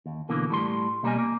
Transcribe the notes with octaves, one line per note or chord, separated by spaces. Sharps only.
D#2
B2 D3 E3 A#3
A2 G3 C6
B2 G3 A#3 A4 D#5 G#5
A#3